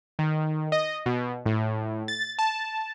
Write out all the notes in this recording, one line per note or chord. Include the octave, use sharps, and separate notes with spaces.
D#3
D#5
B2
A2
A6
A5